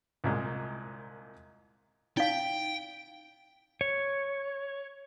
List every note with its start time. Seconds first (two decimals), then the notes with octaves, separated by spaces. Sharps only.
0.24 C2 A#2 G#3
2.17 D#4 F5 G5
3.81 C#5